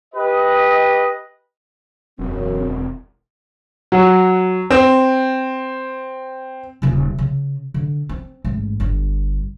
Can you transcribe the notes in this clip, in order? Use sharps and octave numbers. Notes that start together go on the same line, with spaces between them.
G4 B4 D#5
E1 F#2 C4
F#3
C4
D#1 C#3
C#3
D3
C4
A1 G#2
G1 D3